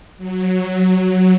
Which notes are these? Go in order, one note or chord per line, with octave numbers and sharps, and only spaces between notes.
F#3